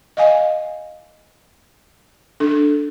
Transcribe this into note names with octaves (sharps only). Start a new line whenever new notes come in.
D#5 F5 G#5
D4 A4